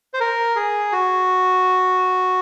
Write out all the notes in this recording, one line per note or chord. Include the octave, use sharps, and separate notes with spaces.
C5
A#4
G#4
F#4